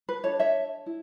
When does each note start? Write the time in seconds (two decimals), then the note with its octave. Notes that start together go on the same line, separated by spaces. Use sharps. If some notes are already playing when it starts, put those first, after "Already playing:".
0.09 B4
0.24 D4 F#4 A4 C#5
0.39 C#5 E5
0.86 E4